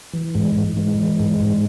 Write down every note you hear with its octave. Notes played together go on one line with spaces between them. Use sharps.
E3
G#2 G#3
G#2
E3 G#3
E3
G#2
G#2